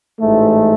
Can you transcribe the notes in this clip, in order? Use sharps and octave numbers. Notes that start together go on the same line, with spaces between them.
A1 G#2 E3 A3